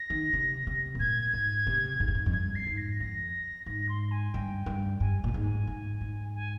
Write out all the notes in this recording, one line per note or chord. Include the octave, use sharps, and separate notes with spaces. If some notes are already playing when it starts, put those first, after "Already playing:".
Already playing: A#6
D#3
C3
C3
G#2
A#2 G#6
G#2
C3
G#2
G2
G#2
F2
G2 G#6
C7
G#2
A#6
F2 A#6
G#2 A#6
C6
G#5
G2 G5
G2
G2 G#5
A#2
G#2
G#5
G#2
G#2
G#5